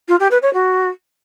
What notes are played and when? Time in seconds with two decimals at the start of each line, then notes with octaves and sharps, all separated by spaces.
0.08 F4
0.20 G4
0.31 B4
0.42 C#5
0.53 F#4